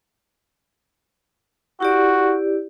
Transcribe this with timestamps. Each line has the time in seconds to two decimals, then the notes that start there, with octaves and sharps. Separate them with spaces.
1.80 E4 F#4 G4 D5